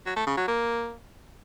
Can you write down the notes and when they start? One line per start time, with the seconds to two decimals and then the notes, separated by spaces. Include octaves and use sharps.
0.06 F#3
0.16 A3
0.27 C#3
0.37 F#3
0.47 A#3